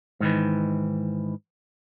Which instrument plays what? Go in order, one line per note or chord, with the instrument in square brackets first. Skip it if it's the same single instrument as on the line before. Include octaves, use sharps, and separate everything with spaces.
[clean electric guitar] G#2 D#3 E3